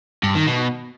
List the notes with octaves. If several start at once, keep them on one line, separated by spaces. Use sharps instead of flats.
G2
D#3
B2